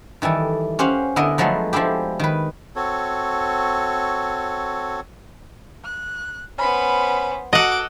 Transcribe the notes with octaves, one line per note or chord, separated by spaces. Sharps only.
D#3 E3 G3 A4
C#4 G4 C5 F5 F#5
D3 B3 E4 A#4 D#5
F3 F#3 G#3 A3 B3
F3 G#3 D4 E4 G4
D#3 B4
C4 F#4 A4 C#5
F#6
B3 C#4 C5 B5
F#4 A4 D#5 F#5 D6